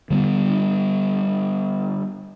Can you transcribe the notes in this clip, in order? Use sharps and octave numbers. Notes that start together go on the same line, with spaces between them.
D3 G3 A#3 B3